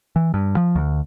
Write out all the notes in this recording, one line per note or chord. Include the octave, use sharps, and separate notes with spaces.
E3
G2
F3
D2